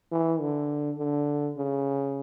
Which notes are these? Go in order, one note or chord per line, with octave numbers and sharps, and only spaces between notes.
E3
D3
D3
C#3